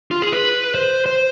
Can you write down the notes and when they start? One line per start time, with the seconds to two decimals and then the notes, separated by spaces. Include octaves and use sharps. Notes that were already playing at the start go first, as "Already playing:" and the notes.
0.11 F4
0.22 G#4
0.32 B4
0.75 C5
1.06 C5